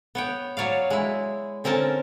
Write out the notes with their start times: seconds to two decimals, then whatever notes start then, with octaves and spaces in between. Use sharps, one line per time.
0.15 B3 C#5 G5
0.57 F#3 C#5 D5 F5
0.90 G#3 E4
1.64 D3 C4 C#4 A#4 A5